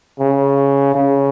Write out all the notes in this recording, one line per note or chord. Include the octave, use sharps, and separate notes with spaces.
C#3
C#3